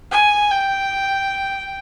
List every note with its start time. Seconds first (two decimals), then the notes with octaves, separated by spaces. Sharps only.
0.12 G#5
0.51 G5